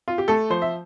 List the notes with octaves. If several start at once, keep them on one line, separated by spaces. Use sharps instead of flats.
F4
G4
A3 A4
F3 C5
E5